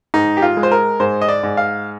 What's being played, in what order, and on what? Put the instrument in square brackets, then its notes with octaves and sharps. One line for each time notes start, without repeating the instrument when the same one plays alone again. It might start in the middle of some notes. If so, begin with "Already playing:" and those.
[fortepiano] G#2 D#4
G4
F4
G#3
C5
A#4
G#2 C5
D#5
D5
G#2
F5